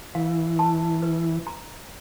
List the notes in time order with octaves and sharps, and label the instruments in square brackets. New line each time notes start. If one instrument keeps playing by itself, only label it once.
[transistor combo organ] E3 [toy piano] F5
[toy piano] A5
B4
A#5